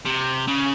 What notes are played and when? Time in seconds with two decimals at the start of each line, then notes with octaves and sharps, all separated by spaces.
0.05 C3
0.48 C#3